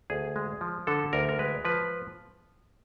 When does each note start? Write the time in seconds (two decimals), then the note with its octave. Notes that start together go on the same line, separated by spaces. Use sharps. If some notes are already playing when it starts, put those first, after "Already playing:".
0.10 D2 G#4
0.36 G#3
0.61 F3
0.87 D3 A4
1.13 D2 A#4
1.29 A#4
1.39 G#3 B4
1.65 F3 B4